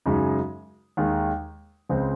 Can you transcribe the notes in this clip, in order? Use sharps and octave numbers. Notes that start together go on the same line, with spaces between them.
F#2 C#3 G#3 D#4
D#2 D#3 G#3
C#2 C#3 G#3 C4